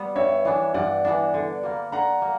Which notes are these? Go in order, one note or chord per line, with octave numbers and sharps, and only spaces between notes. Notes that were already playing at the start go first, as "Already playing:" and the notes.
Already playing: G3 B3
G2 C#5 E5
E3 B3 D4
G2 D5 F#5
E3 B3 D4
D3
G3 A#3
D3 F#5 A#5
A#3